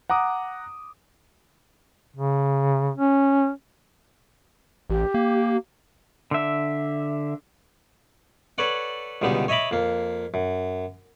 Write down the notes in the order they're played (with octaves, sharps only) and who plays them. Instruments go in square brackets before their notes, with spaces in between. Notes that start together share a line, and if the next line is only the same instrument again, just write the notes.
[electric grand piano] F#5 A#5 D6 D#6
[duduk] C#3
C#4
[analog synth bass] A1 [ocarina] G4
[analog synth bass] A#3
[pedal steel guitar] D3 E5
[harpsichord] A4 B4 C#5 D5 F#5
C#2 B2 D3 G3 D#4 G4
C#5 D#5 E5 A#5 B5 D6
F2 A#3
F#2